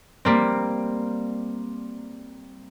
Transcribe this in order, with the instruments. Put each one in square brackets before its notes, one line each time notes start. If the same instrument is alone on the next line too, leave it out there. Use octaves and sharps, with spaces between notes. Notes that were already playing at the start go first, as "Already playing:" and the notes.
[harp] G3 A#3 C4